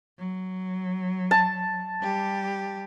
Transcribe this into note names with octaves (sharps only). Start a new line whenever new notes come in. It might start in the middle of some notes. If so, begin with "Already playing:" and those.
F#3
A5
G3 G4